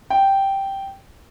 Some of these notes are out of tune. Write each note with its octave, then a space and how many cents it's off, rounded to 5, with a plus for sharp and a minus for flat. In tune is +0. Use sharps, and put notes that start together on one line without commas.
G5 -5